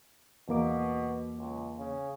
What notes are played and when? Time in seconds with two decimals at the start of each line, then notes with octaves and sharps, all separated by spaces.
0.49 E2 B2 A#3 D6
1.38 C#2
1.79 C#3